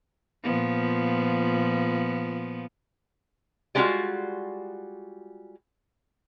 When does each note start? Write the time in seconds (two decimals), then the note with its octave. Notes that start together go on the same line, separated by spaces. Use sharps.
0.43 A#2 F3 B3
3.75 G3 G#3 A#3 C#4 F4 F#4